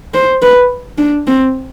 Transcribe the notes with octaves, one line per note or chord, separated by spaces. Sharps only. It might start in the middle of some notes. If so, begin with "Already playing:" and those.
C5
B4
D4
C4